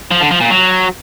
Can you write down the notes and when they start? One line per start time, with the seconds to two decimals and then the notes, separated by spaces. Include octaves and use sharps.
0.11 F3
0.21 D3
0.31 F3
0.41 A#2
0.51 F#3